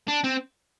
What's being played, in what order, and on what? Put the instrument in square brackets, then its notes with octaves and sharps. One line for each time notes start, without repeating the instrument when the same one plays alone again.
[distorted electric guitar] D4
C4